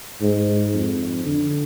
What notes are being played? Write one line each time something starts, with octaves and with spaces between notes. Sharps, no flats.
G#2
F2
D3